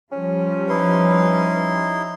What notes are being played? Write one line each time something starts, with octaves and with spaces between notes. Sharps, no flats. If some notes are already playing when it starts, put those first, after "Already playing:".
F3 G3 C#4
D#4 E4 B4 C6